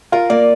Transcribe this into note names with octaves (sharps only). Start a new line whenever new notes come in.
F4 A#4
A#3 D5